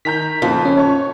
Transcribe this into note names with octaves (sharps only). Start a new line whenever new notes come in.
D#3 A#5 G6 B6
F2 A#2 C#3
C#4
C#5 C#6